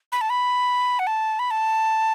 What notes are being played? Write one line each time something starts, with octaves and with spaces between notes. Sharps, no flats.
B5
A5
B5
F#5
A5
B5
A5